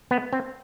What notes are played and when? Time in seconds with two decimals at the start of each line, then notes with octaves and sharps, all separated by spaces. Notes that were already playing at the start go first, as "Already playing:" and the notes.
0.11 B3
0.33 C4